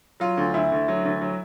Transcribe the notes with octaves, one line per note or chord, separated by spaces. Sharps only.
F#3 F4
D2
D2 E4
D2
F#3
D2
F#3